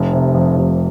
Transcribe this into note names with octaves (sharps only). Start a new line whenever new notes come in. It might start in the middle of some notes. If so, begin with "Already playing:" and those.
Already playing: F1
C3
F2
F1